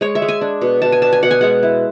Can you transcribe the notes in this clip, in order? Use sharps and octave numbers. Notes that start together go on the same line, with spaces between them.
G#3 C#5
E5
G#3
G#5
D4
B2
B2 A5
G#5
D4 A5
G#5
B2 F#5
G#5
G#3 F#5
E4